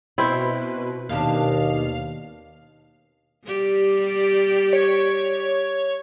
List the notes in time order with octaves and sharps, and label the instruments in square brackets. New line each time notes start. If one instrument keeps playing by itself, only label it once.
[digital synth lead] B2 [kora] C4 E4
[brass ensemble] D#2 [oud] B2 C#4 D4 [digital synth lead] F5
[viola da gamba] G3 G4 D5
[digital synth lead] C#5